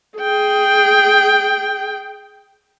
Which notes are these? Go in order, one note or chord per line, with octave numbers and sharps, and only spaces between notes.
G#4 G5